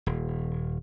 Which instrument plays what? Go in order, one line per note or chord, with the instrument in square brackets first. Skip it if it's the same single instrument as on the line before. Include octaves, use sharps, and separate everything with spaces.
[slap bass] D#1